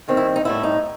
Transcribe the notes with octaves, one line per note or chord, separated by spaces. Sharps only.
D#2 D#3 G3 C4
E4
D#4
A2 G3 B3 E4
D#4